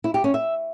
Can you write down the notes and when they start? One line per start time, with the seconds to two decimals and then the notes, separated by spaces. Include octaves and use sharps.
0.04 E4
0.14 G4
0.24 C#4
0.34 E5